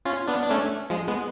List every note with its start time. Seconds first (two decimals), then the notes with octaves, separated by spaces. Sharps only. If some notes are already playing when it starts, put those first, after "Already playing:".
0.05 C#4 F4
0.27 B3 D4
0.42 D4
0.51 A3 C#4
0.90 F3 G#3
1.08 G#3 B3